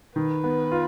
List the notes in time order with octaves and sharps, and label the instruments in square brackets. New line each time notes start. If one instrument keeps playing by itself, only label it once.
[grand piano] D#3 [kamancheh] B4
[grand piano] B3
F4